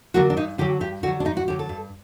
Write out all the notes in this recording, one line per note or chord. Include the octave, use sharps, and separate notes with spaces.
D3 F#3 A#3 F#4
D4
G2 D#4
D3 F#3 G4
G2 G4
D3 F#3 F#4
D4
G2 D#4
F#4
D3 F#3 G4
A4
G2